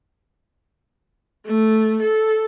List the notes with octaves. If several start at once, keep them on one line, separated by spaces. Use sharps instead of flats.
A3
A4